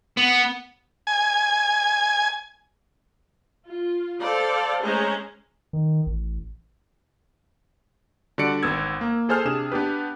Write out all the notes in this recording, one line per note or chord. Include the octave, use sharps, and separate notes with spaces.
B3
G#5
F4
A4 C5 D5 F5
G#3 A3 C#4 G#4 C5 A#5
D#3
A1
D3 G3 F#4 D5 C#7 D7
G#1 B3 E6 G#6
A#3
G#4 A4 C5 G#5 F6
C3 D4 G#4 E7
B3 D4 G4 B4